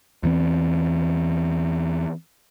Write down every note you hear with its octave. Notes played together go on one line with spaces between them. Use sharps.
E2 E3 C4